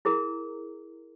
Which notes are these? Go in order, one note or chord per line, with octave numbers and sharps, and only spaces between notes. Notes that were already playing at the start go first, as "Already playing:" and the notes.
E4 G#4 A#4 A#5